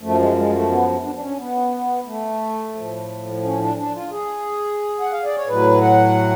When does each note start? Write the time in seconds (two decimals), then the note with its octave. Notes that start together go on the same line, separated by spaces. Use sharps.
0.01 F#2 F3 A3
0.19 G#3
0.36 G#3
0.53 A3
0.69 B3
1.04 D4
1.15 D4
1.22 C#4
1.39 B3
2.06 A3
2.75 A2 F3
3.44 C#4
3.60 D4
3.77 D4
3.95 F4
4.11 G#4
5.00 F#5
5.12 F5
5.24 D5
5.37 C#5
5.48 A2 F#3 B4
5.82 F#5